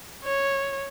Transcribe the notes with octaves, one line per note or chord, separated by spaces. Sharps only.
C#5